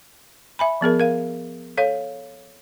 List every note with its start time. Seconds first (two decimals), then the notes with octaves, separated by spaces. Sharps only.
0.59 E5 G#5 B5
0.81 F3 B3 G#4 A#4
1.00 A#4 F5
1.77 A4 C#5 F5